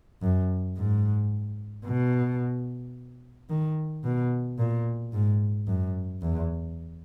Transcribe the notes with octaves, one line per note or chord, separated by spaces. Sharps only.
F#2
G#2
B2
D#3
B2
A#2
G#2
F#2
E2